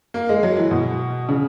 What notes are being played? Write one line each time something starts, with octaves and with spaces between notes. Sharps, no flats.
A#3
G#3
F#3
E3
B2
C#3